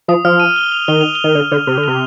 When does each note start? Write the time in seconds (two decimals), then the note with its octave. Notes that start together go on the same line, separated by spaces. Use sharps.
0.08 F3 D#6
0.25 F3 F6
0.40 D#7
0.56 G7
0.72 F7
0.88 D#3 G7
1.01 F7
1.15 G7
1.24 D#3
1.35 D3
1.52 D3
1.67 C3
1.78 D3
1.84 F7
1.88 C3